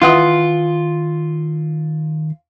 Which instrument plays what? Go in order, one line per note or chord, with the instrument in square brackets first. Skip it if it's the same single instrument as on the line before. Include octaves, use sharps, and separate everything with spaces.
[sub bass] D#3 [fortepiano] E3 F#5 D#6 [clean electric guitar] F4